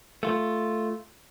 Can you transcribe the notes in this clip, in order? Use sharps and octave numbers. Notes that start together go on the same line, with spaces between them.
A3 F4